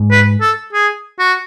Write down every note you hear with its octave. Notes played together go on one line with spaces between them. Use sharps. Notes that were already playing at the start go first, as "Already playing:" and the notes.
Already playing: G#2
B4
A4
G#4
F#4